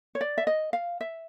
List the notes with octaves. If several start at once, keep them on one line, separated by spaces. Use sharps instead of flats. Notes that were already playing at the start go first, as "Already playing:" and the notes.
C#5
D5
E5
D#5
F5
E5